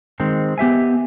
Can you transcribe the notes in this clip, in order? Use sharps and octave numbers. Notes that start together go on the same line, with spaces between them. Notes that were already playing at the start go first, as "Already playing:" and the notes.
D#3 G#3 C4
B3 G4 E5 G#5